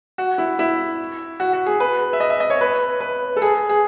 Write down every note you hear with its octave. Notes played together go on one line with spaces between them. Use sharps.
F#4
E4
E4
F#4
F#4
G#4
B4
E5
D#5
E5
D#5
C#5
B4
B4
A4
G#4
G#4